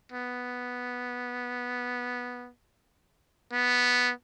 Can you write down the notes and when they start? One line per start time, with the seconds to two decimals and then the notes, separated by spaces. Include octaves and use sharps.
0.12 B3
3.52 B3